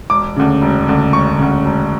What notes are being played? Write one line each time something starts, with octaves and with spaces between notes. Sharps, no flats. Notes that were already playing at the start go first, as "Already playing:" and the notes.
E1 D6
D2 C#3
E1
D2 C#3
E1 C#6
D2 C#3
E1